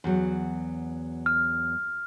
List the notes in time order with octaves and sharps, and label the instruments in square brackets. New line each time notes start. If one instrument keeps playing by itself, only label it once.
[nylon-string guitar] E2 F#3
[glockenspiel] F6